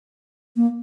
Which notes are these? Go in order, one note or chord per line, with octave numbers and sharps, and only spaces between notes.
A#3